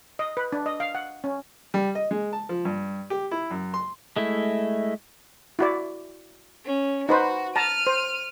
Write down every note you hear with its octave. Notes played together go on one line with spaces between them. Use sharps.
D#5
B4
D4
D#5
F5
F#5
C#4
G3
D#5
G#3
A5
F3
G2
G4
E4
F#2
C6
G#3 A3 E4
E4 F#4 D5
C#4
D#4 F#4 B4 C5
A5 A#5 F6 D#7
C5